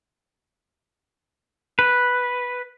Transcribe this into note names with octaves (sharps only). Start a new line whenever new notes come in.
B4